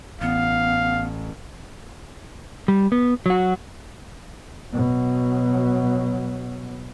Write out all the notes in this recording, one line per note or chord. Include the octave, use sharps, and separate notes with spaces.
A1 B3 F5
G3
B3
F#3 F#4
B2 F#3